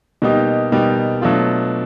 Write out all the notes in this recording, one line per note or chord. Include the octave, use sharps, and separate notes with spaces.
B2 G3 A#3 D#4 G4
B2 G3 A#3 D#4 G4
B2 F#3 A3 D4 F4